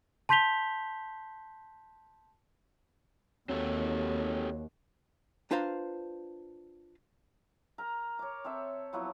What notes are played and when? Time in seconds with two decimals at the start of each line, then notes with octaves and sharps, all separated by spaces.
0.29 A5 C6 G6 B6 F7 G7
3.49 D#2 F#3 C4 G4 A4
5.51 D4 F4 B4 C5 F5 A#5
7.78 A#4 A#5
8.19 C#5 D6
8.44 C4 A4 C#5 E5
8.93 F3 F#3 B3 E4